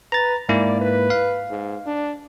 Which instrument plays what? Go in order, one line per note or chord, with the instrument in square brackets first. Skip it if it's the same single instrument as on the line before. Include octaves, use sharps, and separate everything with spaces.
[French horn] B4 [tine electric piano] A#5 A6
[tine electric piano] G#2 A#3 E4 [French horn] D5
[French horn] B4
[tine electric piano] F5
[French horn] G#2
D4